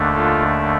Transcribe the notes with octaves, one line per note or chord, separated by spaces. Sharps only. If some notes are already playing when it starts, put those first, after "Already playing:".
Already playing: D#2 D3 A3 D4
F4 A4